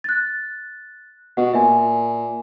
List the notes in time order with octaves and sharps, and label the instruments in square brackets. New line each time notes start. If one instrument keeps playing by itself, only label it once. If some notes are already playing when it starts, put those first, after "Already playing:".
[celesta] F#6 A6
[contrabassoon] B2 [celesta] F#5
[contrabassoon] A#2 [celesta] E5 G#5